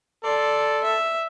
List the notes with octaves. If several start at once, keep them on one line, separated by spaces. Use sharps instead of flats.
A4 D5 C6
E5